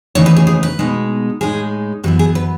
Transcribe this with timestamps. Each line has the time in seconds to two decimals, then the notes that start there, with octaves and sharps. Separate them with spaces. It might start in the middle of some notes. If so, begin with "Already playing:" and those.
0.15 D#2 C#3 E3 A3 D#4 C#5
0.26 B4
0.36 G#4
0.47 G#4
0.63 B4
0.79 B2 G#3 D#4
1.41 A2 G#3 D#4 G#4
2.04 F#2 E3 B3 E4 F#4
2.19 G#4
2.35 B4